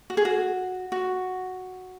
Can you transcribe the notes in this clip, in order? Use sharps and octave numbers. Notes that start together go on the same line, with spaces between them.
F#4
G#4
F#4
F#4